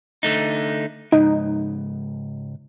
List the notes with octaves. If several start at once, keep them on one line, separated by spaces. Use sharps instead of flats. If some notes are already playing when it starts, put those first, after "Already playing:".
D3 A3 D#4
C#2 G#2 D#4